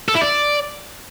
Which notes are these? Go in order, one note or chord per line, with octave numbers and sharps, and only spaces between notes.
A4
E4
D5